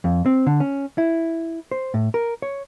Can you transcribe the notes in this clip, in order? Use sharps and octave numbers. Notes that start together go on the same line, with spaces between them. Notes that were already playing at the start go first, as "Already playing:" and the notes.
F2
C4
D3
C#4
E4
C5
A2
A#4
C#5